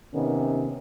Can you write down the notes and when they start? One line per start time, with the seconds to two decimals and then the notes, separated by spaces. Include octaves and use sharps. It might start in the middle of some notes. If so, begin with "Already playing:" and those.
0.14 C3 D#3 B3 C#4